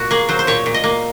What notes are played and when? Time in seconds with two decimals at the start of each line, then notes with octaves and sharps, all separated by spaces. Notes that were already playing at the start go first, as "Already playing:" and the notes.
Already playing: A#2 F#4
0.11 A#3 G#4
0.29 F#3 C5
0.39 C5
0.47 A#2 C#5
0.66 A#2
0.74 D#5
0.84 A#3